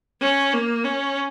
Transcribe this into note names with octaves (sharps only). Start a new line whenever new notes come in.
C#4
A#3
C#4